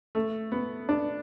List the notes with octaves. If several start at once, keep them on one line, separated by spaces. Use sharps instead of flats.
A3
B3
D4